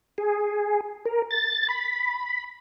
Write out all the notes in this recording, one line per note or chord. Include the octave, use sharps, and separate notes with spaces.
G#4
A#4
A6
B5